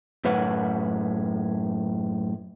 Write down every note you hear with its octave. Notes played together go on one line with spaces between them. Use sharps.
F#2 A2 B4 C#5 F#5